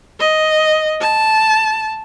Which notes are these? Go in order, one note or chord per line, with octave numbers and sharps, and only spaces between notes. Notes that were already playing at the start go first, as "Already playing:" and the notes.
D#5
A5